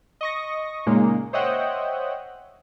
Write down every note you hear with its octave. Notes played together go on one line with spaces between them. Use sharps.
D#5 C#6 A#6
A#2 C#3 G#3 A#3 D#4
C5 C#5 D#5 E5 F#5 G5